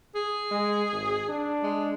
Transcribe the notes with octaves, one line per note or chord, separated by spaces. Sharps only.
G#4
G#3
G#1
D4
G#3